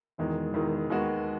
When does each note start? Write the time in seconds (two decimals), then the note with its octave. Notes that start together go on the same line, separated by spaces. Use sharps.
0.18 E1 E2 D#3 G#3
0.53 E1 E2 D#3 G#3
0.90 D#2 D#3 G#3 B3 F#4